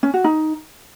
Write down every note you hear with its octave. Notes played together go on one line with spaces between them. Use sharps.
C#4
F#4
D#4